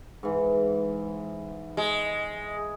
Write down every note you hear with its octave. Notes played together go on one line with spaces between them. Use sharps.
G#2 E3
G#3